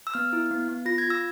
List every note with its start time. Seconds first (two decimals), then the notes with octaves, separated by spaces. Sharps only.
0.07 E6
0.14 B3 F6
0.33 E4
0.51 B3
0.68 B3
0.85 F4 A#6
0.98 G#6
1.04 F4
1.10 E6